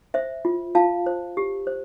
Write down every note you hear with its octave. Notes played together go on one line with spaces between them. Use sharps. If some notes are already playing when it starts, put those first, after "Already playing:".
C5 E5
F4
F4 F5 A5
C5
G4
C5